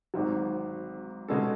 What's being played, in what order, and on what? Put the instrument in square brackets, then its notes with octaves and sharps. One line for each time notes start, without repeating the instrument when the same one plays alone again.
[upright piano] G#1 G#2 F#3
B2 G#3 C#4 F#4 A4